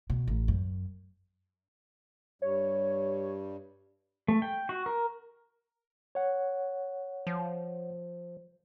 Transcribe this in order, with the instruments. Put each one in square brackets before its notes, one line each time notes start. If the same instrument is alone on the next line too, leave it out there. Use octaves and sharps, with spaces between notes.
[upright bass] B2
A1
F#2
[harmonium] G2 G3 [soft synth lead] C#5
[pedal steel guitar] A3
G5
F#4
A#4
[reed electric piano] C#5 F#5
[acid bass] F3